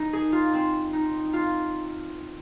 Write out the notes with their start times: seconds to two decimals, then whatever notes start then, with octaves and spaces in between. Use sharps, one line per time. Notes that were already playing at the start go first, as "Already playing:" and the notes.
Already playing: D#4
0.13 G#4
0.32 F4
0.53 C4
0.93 D#4
1.33 F4